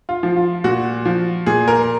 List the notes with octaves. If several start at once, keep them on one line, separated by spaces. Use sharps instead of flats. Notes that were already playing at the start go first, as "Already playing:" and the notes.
F4
F3
F4
A#2 F#4
F3
A#2 G#4
A#4